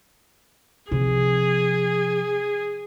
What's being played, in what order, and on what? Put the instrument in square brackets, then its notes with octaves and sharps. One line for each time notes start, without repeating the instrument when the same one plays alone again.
[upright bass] C3 F3 [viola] G#4